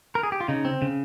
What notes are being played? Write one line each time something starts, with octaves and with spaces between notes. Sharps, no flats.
A#4
G#4
G4
F4
C#3 D#4
C4
C#3